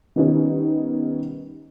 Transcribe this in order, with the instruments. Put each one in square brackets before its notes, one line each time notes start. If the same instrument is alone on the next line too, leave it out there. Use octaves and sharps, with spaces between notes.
[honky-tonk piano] D#3 G3 B3 C#4 D#4